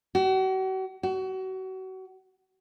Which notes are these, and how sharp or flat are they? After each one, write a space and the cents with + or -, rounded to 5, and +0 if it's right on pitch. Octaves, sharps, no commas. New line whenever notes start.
F#4 +40
F#4 +30